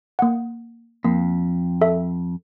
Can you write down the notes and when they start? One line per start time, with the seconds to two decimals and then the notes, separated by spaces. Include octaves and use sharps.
0.19 A#3 F#5
1.04 F2 A#3
1.81 A4 E5